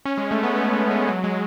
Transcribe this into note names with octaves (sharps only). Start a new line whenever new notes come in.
C#4
G#3
A3
B3
A3
G#3
G#3
F#3
G#3